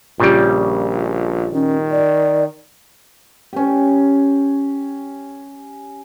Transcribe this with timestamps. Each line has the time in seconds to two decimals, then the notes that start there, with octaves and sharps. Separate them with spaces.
0.20 A#1 A#2 C#3 G3
1.53 D#3 C#4
1.91 D5
3.53 C#4 G4